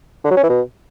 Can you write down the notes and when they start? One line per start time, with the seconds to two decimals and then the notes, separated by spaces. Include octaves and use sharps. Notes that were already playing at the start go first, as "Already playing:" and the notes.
0.24 D3
0.31 F#3
0.37 C#4
0.43 E3
0.49 B2